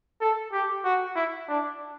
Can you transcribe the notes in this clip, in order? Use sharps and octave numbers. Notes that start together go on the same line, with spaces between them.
A4
G4
F#4
E4
D4